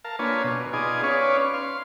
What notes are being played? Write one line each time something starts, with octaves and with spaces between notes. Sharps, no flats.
A#4 F5 A5
A#3 D4 F4 B4 C#5 G#5
B2
B3 D#4 F4 G#4 D5 G#5
C#4 B4 C#5 D5 F5
F5 C6